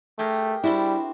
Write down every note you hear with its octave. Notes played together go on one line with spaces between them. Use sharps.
A3 G4 G#4 A#4
G3 C4 D4 E4 F#4